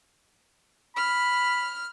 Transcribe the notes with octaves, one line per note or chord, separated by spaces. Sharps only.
B5 F6